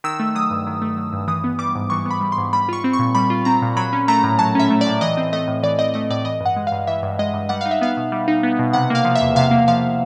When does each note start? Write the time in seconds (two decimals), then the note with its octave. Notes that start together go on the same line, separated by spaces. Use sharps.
0.04 D#3 E6
0.20 A3
0.35 F#3 D#6
0.51 G2
0.67 D#3
0.82 A3
0.97 F#3
1.13 G2
1.28 E3 D#6
1.44 B3
1.59 G3 D6
1.75 G#2
1.90 E3 C#6
2.06 B3
2.11 B5
2.21 G3
2.32 C6
2.38 G#2
2.53 G3 B5
2.69 F4 C#6
2.84 C4
2.93 C#6
2.99 A#2
3.15 G3 B5
3.30 F4
3.45 C4 A#5
3.62 A#2
3.76 F#3 B5
3.93 C#4
4.08 A3 A#5
4.23 A2
4.39 F#3 A5
4.55 C#4 E5
4.70 A3
4.81 D5
4.86 A2
5.01 E3 D#5
5.17 C4
5.33 A3 D#5
5.48 A2
5.63 E3 D5
5.79 C4 D#5
5.94 A3 D#5
6.10 A2 D5
6.25 E3 D#5
6.41 G2 F#5
6.56 G#3
6.67 G2 F5
6.87 E3 E5
7.03 G2
7.19 G#3 D#5
7.34 G2
7.49 G3 F#5
7.61 D#4 F5
7.71 E5
7.81 B3 F5
7.97 B2
8.12 G3
8.28 D#4
8.43 B3
8.59 B2
8.73 C3 F#5
8.90 A#3 F5
9.05 F3
9.16 E5
9.21 E2
9.36 C3 F5
9.51 A#3
9.68 F3 F5